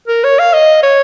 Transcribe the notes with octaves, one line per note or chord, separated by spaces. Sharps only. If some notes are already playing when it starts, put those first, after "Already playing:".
A#4
C#5
F5
D#5
C#5